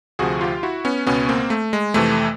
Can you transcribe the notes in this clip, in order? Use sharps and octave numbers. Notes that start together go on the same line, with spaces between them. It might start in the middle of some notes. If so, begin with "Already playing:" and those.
D2 C3 F3 F#4 G#4
F4 G4
E4 F#4
B3 C#4
C#2 B2 B3 C#4
A#3 C4
A3
G#3
F2 C3 E3 A3